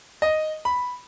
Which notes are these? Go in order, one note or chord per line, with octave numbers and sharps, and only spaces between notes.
D#5
B5